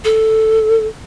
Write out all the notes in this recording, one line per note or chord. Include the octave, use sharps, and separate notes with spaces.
A4